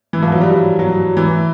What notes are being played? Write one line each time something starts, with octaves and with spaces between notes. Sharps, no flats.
E3
F3
F#3
G3
F#3
E3